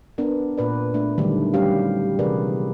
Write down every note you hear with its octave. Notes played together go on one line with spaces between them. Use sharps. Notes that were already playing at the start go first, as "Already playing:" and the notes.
B3 D4 A#4
A#2 B4 D5
A3 D4
D3 D#3 F#3 G3 A3
G3 C#4 F#4 G4 F5
C3 E3 G#4 A#4 B4 D5